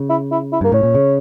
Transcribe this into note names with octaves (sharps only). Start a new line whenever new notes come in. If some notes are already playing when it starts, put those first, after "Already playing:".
Already playing: C#3
E4
E4
E4
G2 A#3
A2 C#4
A#2
C#3